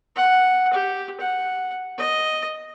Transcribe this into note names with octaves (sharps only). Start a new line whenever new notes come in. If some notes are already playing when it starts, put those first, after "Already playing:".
F#5
G4
F#5
D#5